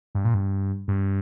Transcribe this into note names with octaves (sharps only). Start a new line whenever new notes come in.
G2
A#2
G2
G2